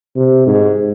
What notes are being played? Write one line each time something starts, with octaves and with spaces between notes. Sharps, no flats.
C3
G#2